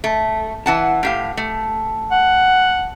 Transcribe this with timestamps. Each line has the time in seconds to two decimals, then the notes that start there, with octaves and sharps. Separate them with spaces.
0.04 A3
0.66 E3 F#5 A5
1.03 A2 G4 F5
1.37 A3
2.12 F#5